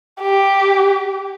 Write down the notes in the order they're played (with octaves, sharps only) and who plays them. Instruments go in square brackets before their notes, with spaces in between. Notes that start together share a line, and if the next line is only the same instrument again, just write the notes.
[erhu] G4